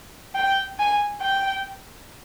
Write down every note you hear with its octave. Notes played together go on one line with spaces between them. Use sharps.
G5
G#5
G5